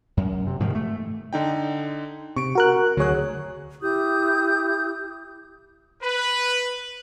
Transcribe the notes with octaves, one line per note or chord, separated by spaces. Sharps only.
F#2
C3
G#2 C3 D#3 F3
A3
D3 D#4 G5
C3 C#6 D7
F#4 A#4 F#6
D2 F#3 G#4 C#5 F#6
E4 G4 D#6 G6
B4